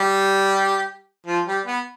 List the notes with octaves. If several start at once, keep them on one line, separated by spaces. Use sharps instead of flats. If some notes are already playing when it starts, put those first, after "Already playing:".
Already playing: G3 G4
F3 F4
G3 G4
B3 B4